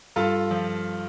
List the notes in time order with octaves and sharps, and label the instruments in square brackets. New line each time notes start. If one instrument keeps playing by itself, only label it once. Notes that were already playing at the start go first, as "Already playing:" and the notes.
[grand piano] G2 F4 A4
F3